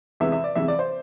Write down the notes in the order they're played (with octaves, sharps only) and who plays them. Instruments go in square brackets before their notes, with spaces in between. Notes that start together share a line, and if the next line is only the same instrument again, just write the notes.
[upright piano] E2 C3 E3 G#3 E5
E5
D5
E2 C3 E3 G#3 E5
D5
C5